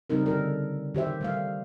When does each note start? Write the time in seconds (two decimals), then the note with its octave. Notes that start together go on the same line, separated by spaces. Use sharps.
0.10 C#3 G3 C4 D#4 A#4
0.26 D3 A4 A#4
0.95 D#3 G4 C5 E5
1.21 G3 A3 F5